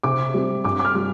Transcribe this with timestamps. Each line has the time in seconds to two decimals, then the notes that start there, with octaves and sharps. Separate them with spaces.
0.03 C3 D6
0.34 G3 C4
0.64 G2 D6
0.79 D6
0.85 F6
0.95 G3